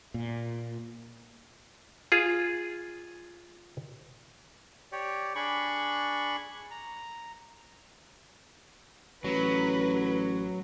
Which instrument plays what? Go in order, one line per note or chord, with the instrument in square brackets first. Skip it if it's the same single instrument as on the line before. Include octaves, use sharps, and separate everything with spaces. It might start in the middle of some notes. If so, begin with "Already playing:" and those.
[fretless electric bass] A#2
[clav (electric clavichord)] F4 G#4
[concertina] G4 C#5 D5
D4 G#4 B5 C#6
A#5
[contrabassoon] A1 [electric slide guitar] F#3 [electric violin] B4